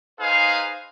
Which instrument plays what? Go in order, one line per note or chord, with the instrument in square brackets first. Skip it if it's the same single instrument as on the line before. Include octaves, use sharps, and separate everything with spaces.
[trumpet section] D#4 G#4 B4 C5 F5